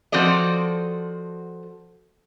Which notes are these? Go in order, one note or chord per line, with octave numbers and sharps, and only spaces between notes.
F3 C4 F#4 A4 D5 D#5